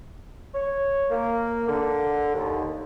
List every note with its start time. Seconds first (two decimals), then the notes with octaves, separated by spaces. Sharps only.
0.54 C#5
1.10 A#3
1.67 D3
2.34 D#2